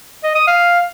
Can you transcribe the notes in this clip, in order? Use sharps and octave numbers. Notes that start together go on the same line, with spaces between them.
D#5
D#6
F5